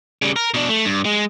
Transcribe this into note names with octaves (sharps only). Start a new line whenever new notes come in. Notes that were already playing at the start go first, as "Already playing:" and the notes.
C#3 G3
A#4
B2 D4
A3
G2
G#3